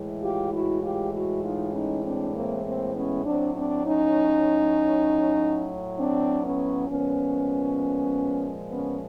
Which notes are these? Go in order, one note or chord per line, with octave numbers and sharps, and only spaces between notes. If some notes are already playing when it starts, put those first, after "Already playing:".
Already playing: A2 E3 G#3
F4 G4
E4 F#4
F4 G4
E4 F#4
D#4 F4
C#4 D#4
C4 D4
A#3 C4
A#3 C4
B3 C#4
A2 F#3 C4 D4
C4 D4
C#4 D#4
C4 D4
B3 C#4
A#2 F3 G#3 B3 C#4
B3 C#4